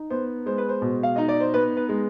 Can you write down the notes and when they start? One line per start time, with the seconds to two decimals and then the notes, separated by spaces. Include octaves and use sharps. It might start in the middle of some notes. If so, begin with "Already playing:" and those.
Already playing: D#4
0.10 B3 C5
0.46 G#3 C5
0.58 B4
0.69 C5
0.82 B2
1.03 F5
1.16 D#4 D#5
1.29 D5
1.40 C5
1.54 B3 B4
1.77 B4
1.89 G#3